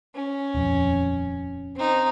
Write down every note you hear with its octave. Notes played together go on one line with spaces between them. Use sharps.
C#4
D#1 F2
C4 D#4